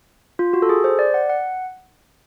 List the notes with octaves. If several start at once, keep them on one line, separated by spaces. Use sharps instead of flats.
F4
F#4
A4
G#4
C5
D5
F#5
F#5